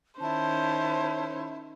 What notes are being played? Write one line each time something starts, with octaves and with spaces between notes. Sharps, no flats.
D#3 C#4 E4 C5 A5